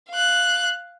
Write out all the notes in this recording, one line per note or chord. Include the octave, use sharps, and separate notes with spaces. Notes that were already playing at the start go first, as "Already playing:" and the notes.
F5 F#6